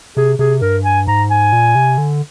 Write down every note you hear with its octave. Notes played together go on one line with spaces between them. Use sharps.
C3 G#4
C3 G#4
G2 A#4
G#5
G#2 A#5
G#5
A#2
C3
D3